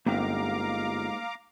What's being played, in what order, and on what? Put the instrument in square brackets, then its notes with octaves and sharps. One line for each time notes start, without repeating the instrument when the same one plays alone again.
[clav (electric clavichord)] G1 [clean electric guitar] G#2 [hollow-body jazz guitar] A#3 C#4 G5 [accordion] F5 A#5 D6